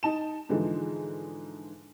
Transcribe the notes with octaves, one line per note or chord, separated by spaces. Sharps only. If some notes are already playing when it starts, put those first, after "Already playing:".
D#4 A5 E7
G#2 D3 E3 F3 G#3